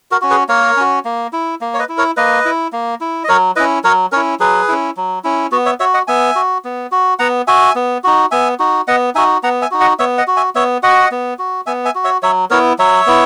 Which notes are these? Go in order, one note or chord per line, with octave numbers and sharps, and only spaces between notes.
F#4 A#4
C#4 F#4
G#4 B4
A#3 A#4 C#5
C#4 F#4
A#3
E4
A#3
C#5
B4 D#5
E4
A#4 C#5
A#3 B4 D#5
E4
A#3
E4
D#5
F#3 A#4 C#5
C#4 E4 B4 D#5
F#3 A#4 C#5
C#4 E4 A#4 C#5
F#3 G#4 B4
C#4 E4
F#3
C#4 E4
B3 F#4
C#5 E5
F#4 C#5 E5
D#5 F#5
B3 E5 G#5
F#4
B3
F#4
B3 F#5 A#5
F#4 E5 G#5
B3
D#4 F#4
B3 E5 G#5
D#4 F#4
B3 D#5 F#5
D#4 F#4 E5 G#5
B3 F#5 A#5
E5 G#5
D#4 F#4
D#5 F#5
B3 C#5 E5
D#5 F#5
F#4
E5 G#5
B3 C#5 E5
F#4 D#5 F#5
B3
F#4
B3 E5 G#5
E5 G#5
F#4
C#5 E5
F#3 C#5 E5
B3 E4 A#4 C#5
F#3 C#5 E5
B3 E4